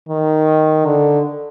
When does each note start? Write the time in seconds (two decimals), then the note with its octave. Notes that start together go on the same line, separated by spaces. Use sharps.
0.09 D#3
0.85 D3